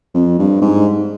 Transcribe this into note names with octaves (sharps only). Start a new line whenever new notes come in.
F2
G2
G#2